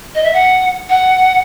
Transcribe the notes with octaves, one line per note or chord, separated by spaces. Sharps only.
D#5
E5
F#5
F#5